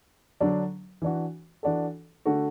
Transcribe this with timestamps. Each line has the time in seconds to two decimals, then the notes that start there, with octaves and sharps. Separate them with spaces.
0.41 D3 F#3 D4
1.02 E3 D4 F#4
1.63 E3 D4 F#4 A4
2.25 D3 A3 F#4